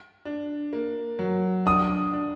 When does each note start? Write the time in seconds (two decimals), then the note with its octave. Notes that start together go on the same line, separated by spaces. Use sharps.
0.25 D4
0.73 A#3
1.19 F#3
1.66 D4 D#6
2.13 D4